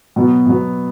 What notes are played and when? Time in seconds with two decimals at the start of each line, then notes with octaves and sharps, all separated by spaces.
0.16 B2 F#3 B3
0.47 B2 F#3 B3